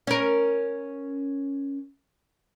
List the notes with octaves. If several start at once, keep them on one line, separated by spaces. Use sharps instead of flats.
C#4 A#4